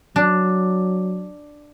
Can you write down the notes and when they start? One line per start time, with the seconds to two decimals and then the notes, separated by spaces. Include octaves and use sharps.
0.16 F#3 D4